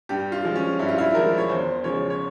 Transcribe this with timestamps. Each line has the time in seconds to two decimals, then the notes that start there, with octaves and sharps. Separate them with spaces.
0.09 G2 G4
0.32 F4
0.44 F3 G#3
0.55 C#4
0.79 G2 E4
0.89 F4
0.98 E4
1.14 F3 G#3 A#4
1.38 C#5
1.49 E2 C5
1.84 C#3 F3 G#3 C#5
2.10 C#5